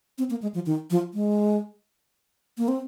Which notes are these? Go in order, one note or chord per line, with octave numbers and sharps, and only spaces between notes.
C4
A#3
G#3
F3
D#3
F3
G#3
A#3
C4